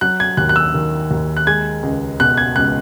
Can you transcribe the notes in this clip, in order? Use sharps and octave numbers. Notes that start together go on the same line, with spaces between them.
F#3 F#6
G#6
D#2 F#6
F#6
E6
D#3
D#2
F#6
G#3 G#6
C#2
B2 F#6
G#6
C#2 F#6